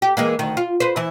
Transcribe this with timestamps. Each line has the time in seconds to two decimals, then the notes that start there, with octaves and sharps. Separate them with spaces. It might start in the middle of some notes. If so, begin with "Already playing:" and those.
0.02 G4
0.17 E3 G#3 A#3
0.39 D2 D#3
0.57 F4
0.80 B4 C5
0.96 E3 E4